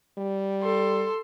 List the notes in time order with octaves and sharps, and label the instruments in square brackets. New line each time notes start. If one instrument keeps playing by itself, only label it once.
[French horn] G3
[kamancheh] A4 C6